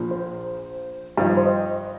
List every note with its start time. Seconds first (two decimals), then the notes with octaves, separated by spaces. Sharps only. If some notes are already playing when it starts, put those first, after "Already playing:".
Already playing: A#1 A#2 F3
0.11 C5
1.17 G2 F3 D#4 F5
1.26 D#5
1.37 C5
1.45 D#5